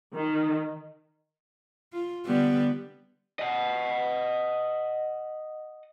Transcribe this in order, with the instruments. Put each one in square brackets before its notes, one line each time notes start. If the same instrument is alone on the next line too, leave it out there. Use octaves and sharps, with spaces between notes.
[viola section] D#3
[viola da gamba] F4
D3 G3 B3
[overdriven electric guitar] D#5 F#5